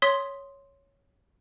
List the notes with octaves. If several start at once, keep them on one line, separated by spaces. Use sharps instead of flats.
C#5 C6 D#6 B6 G7